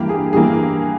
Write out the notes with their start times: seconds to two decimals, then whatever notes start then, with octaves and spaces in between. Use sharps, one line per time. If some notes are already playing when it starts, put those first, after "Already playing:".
Already playing: G2 E3 A#3 G4
0.09 G#4
0.33 G2 E3 A#3 G#4